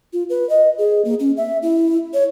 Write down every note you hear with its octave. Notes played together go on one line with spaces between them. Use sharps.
F4
B4
D#5
G#4
A#3
C#4
E5
E4
C#5